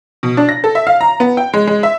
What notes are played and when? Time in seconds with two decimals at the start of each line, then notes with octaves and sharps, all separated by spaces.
0.23 B2
0.37 D4
0.49 A#6
0.64 A4
0.75 E5
0.87 F5
1.01 A#5
1.20 B3
1.37 G5
1.54 G#3
1.67 G#3
1.83 E5